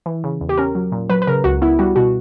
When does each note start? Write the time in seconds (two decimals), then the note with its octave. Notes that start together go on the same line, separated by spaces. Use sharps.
0.06 E3
0.24 C#3
0.41 E2
0.49 G4
0.58 C#4 A#4
0.75 F#3
0.92 A#2
1.10 F#3 B4
1.22 B4
1.27 C#3 A#4
1.44 C#2 F#4
1.62 B3 E4
1.79 G3 F#4
1.96 B2 F#4